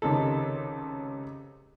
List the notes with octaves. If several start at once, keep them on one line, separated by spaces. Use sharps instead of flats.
C#2 C3 D#3 A4